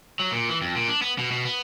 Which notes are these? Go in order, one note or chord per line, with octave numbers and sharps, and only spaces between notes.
F#3
A#2
E3
F2
A#2
D4
B3
B2
B2
B3